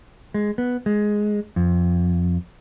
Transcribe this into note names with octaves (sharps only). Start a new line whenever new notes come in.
G#3
B3
G#3
F2